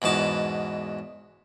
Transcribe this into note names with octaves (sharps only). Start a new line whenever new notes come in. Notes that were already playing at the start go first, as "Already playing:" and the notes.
E2 G#2 B2 A5